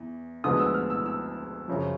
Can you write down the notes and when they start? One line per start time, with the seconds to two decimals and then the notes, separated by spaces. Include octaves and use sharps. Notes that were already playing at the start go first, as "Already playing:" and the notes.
Already playing: E2 E3
0.44 D2 D3 F3 G#3 B3 D#6
0.60 E6
0.74 F6
0.90 E6
1.06 E6
1.68 F#2 C#3 F3